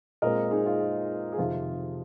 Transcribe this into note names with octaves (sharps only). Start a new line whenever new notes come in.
A#2 G#3 C4 A#4 D#5
D#4 G#4
F4
G#4
F2 C3 D#3 F4